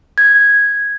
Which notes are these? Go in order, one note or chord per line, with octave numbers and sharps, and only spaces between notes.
G#6